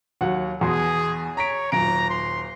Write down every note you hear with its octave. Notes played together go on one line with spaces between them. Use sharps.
D#2 F#3 F#5
E2 B2 G#4 C6
C#5 A#5 B6 D7
D#1 F#2 A#5 D7
C6